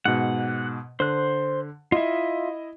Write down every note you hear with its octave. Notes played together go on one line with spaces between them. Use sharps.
G#2 B2 F#5
D3 C5 F#6
E4 F4 D#5 E5